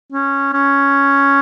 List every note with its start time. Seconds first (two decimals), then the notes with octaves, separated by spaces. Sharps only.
0.12 C#4
0.53 C#4